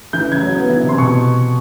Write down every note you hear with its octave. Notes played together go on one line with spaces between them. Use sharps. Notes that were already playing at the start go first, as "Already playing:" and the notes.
E3 G6
C#3 G#6
F#3
B3
E3
C3
C6
B2 C#6